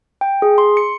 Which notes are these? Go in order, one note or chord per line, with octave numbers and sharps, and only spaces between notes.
G5
G#4
C6
C#7